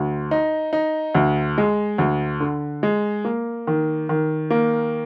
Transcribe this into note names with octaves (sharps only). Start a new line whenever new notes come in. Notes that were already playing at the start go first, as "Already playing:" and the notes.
Already playing: D2
D#4
D#4
D2
G#3
D2
D3
G#3
A#3
D#3
D#3
A#3